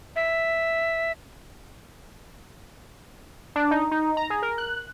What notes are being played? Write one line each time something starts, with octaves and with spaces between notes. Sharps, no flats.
E5
D4
D#4
D#4
A#5
G#4
A#4
F#6